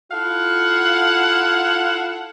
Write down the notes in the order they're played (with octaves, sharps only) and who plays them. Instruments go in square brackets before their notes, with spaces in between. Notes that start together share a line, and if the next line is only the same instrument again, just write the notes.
[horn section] E4 F4 A4 F5 F#5